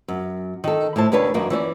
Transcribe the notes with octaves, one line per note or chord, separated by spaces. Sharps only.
F#2
D#3 A4
A2 E4 C5 A5
D#2 C#3 D4 B4 C#5 A5
F#2 D#3 A#3 F#4
E3 C#4 C5 D5